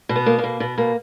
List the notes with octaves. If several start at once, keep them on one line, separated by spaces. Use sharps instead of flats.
B2
B3
A#3
A#3
B2
B2 B3
B2 A#3